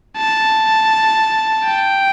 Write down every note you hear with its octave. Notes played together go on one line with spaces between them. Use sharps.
A5
G5